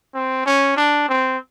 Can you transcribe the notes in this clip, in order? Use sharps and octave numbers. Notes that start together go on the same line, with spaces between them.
C4
C#4
D4
C4